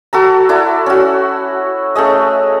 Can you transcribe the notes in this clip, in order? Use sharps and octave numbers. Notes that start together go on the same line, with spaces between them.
F#4 A4 A#5
E4 A4 D5
C#4 F#4
A3 C#4 G#4 D#5